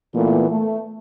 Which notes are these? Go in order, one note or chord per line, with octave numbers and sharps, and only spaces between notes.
A#2 E3 A3 B3
A3